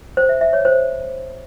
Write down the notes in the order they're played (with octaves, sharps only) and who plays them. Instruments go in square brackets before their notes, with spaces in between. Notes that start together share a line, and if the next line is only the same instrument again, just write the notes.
[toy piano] C5
E5
E5
C#5
C5